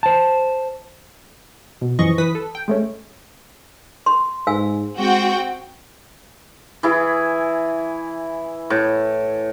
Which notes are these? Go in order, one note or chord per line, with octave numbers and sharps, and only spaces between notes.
C5 A5
B2
F#2 E3 F3 G#4 D#5 C#6
E3 B4 D#6 B6
A4
G5
G#3 A3 C#4
C6
G#2 F5 G#5 E6
G#3 C4 F#4 G5
E3 E4 G#4
A2